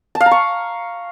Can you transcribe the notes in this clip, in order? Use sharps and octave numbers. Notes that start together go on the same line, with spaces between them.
A5
F5
A#5
C#6